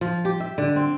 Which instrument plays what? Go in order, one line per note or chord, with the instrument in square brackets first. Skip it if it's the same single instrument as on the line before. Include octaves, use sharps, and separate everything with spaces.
[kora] F3
G4
E5
D3
C4